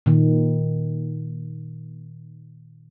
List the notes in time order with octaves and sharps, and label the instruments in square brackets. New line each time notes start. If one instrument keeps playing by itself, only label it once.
[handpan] A#2 D#3